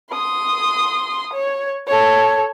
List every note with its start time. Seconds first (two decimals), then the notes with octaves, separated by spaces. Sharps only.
0.12 C6 D#6
1.33 C#5
1.87 A4 C#5